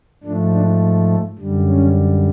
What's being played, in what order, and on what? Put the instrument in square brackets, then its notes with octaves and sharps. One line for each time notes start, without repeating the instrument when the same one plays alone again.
[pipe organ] G#2 F3 A3 D4
D4
F#2 D3 G3
C#4